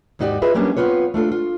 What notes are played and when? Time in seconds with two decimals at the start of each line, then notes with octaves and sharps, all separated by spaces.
0.19 D#2 G#2 D#4 F#4 G4 D5
0.42 F4 G#4 B4 D#5 E5
0.54 F#3 G3 A#3 B3 C#4 D4
0.77 B3 C4 F4 B4 C#5
1.14 A3 D4 F4 A4
1.32 F4